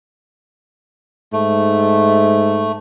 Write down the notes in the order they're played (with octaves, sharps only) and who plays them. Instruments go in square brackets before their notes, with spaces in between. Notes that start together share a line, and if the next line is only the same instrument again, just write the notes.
[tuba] G#2 [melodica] A3